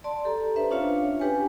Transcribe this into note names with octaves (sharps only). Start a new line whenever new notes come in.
D5 A5 C6
G4 A4 A#5
D4 B4 C5 E5
C#4 D4 F4 C#5 F5
D4 G4 B4 C#5 G5 G#5